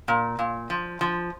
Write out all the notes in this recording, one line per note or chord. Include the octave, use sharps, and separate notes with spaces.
A#2
A#2
F3
F3